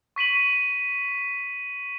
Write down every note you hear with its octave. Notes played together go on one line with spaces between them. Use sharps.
C#6 B6 D#7 F#7